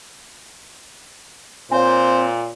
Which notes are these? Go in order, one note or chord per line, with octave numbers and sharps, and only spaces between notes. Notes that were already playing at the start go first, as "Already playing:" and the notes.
A#2 C4 C5 C#5 F5 G#5